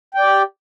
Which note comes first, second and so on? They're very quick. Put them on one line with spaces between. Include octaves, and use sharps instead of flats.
G5 D5 G4